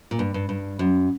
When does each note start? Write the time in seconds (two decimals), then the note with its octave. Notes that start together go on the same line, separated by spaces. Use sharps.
0.11 A#2
0.19 G2
0.34 G2
0.49 G2
0.79 F#2